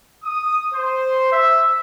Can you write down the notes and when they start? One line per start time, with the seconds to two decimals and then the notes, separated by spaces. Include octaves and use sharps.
0.23 D#6
0.72 C5
1.31 E5